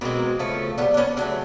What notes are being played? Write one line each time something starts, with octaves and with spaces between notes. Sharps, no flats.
B2 G#3 A#3 C4
C#3 F3 A3
D3 B3 C#4
G3
D4
B3 C#4
C#3 F#3 A3 C4 D4